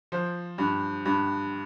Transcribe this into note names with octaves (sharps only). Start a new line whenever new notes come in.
F3 C5
G2
G2